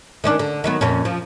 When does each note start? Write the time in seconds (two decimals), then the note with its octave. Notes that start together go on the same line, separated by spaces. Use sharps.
0.24 D#3 C#4 D4
0.39 D3
0.64 D#3 F#3 B3
0.81 F2 A#2 C#4
1.05 F3